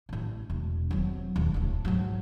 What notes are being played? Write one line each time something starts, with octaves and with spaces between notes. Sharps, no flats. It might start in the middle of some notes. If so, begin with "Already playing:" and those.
A1 A2
E1
F#3 C4
D#1 F#2
D1 A2
G#2 F#3